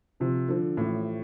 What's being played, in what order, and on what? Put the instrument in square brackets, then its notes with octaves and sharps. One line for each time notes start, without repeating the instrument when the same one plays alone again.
[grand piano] C3 [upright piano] F3
[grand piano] D3 [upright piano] F3
[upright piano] A1 [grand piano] A2